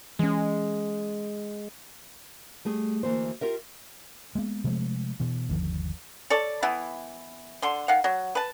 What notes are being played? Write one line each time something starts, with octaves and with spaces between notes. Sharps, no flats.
E3 G#3 C#4
G3 A3 G#4
D2 E3 A#3 C5
F4 G4 A#4 E5
G#3 A#3 B3
C3 F3 G#3 A3
B2 E3
G1 D#2 D3 F3
A4 C#5 D5
E3 B3 E4
D3 C6
D#3 F5 F#5
F#3
B4 A5